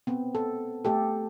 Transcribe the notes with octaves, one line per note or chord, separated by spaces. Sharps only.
B3 C4
A4
A3 G4 A4